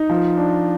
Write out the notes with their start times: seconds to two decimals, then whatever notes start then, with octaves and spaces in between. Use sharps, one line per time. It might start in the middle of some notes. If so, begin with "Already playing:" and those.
Already playing: D#4
0.10 F3
0.37 D4